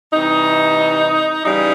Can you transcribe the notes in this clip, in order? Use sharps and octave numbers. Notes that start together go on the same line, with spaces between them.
C3 E3 G3 D#4
C#3 E3 G3 D#4